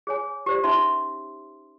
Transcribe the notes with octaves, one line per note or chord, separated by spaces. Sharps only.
G#4 C#5 G#5
G4 C5 D5
C#4 D#4 E5 C6